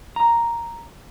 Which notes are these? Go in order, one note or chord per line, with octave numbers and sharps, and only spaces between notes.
A#5